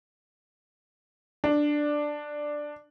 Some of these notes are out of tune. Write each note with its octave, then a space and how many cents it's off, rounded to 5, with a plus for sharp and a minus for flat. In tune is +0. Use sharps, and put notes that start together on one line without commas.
D4 +5